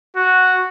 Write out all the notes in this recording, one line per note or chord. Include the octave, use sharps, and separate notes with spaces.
F#4